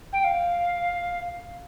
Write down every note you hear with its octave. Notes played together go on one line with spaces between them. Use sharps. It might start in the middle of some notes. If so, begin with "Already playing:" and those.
G5
F5